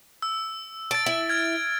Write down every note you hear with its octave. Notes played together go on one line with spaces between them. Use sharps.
E6
A5 A6 D7
E4
F6 G#6